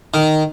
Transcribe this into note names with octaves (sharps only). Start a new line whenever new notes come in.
D#3